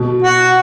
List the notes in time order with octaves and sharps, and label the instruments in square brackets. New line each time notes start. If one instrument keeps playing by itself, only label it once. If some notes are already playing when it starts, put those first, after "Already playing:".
Already playing: [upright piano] B2
[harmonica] F#4